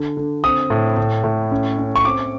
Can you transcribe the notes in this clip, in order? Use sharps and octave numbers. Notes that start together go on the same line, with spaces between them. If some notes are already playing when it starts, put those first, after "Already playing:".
Already playing: D3
D3
C4 D#6
A2
A2
A2
C#4
C#4
C#6
C4 D6